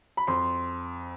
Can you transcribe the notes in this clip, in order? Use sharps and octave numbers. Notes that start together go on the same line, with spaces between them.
B5
F2 C6